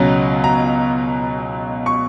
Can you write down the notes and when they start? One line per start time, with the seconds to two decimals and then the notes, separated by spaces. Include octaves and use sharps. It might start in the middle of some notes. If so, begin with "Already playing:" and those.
Already playing: C#2 B2 F#3 C#4 A#5
0.44 A#5
1.86 C#6